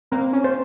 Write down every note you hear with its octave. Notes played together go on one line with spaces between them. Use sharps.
A#3 C4
C#4
C5